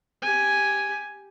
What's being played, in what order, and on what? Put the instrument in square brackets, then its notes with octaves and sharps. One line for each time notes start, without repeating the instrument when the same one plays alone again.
[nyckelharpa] G4 G#5